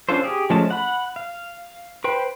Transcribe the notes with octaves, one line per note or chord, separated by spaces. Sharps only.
C#4 D4 F4 A4 C5
G4 G#4
F3 G#3 A3 C#4 A5
F#5 B5
F5
B4 C5 G5